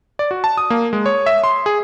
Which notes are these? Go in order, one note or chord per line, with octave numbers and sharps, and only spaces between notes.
D5
F#4
A5
D#6
A#3
G#3
C#5
E5
C6
G#4